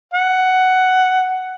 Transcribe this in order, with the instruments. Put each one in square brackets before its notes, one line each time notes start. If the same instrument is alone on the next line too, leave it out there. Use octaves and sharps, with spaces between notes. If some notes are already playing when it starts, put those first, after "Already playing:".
[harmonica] F#5